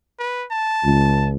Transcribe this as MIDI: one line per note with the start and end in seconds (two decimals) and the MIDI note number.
0.19 0.46 71
0.51 1.29 81
0.84 1.36 37